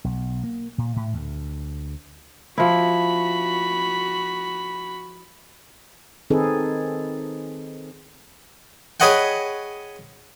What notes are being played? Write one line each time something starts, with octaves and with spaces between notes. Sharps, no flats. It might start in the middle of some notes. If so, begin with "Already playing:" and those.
B1
A#3
A#2
A2
D2
F3 E4 F#4 B5
D#3 C4 D#4 G#4 A4 B4
G#4 B4 C#5 D#5 F#5 G5